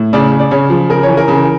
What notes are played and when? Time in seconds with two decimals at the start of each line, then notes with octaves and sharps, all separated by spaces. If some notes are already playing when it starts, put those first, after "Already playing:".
Already playing: A2
0.13 C#3 D5
0.32 C#3
0.40 D5
0.51 C#3 C#5
0.70 F3
0.90 C#3 A#4
1.03 C#5
1.09 E3
1.17 A#4
1.28 C#3